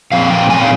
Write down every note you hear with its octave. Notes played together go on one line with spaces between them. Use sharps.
A#2 F3 C4 F5
G5
G#5
F5